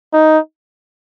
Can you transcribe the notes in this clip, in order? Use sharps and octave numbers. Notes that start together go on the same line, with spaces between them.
D#4